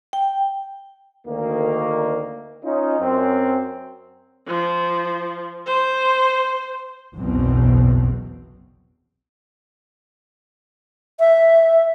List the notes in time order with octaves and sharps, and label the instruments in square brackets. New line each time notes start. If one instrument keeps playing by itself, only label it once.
[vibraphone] G5
[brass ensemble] D2 D#3 A#3
C#4 D#4 F4
F#2 C4
[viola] F3
C5
[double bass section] F#1 B1 E2 B2 C4
[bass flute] E5